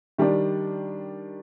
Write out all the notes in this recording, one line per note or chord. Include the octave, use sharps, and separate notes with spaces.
D#3 G3 D4